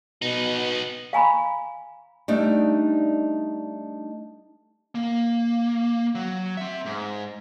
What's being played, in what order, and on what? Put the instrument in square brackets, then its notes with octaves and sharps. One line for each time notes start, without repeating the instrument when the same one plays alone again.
[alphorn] B2 [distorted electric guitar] B3 D#4
[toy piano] F5 G#5 A#5 B5
[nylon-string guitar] G3 A3 D4 D#4
[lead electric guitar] A#3
F#3
C4 E5
G#2